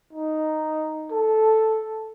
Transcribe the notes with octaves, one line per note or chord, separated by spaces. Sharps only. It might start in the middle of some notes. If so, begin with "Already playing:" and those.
D#4
A4